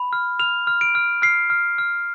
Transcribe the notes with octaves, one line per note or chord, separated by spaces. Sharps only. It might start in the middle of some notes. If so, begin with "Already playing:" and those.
Already playing: B5
F6
F6 F7
F6
D7
F6
F6 C7
F6
F6